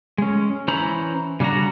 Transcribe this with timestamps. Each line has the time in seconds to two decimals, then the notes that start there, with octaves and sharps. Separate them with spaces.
0.18 G#3 C#4
0.68 E3 C#4 C5 A#5 B5
1.40 C#3 G3 D4 F#4 A#5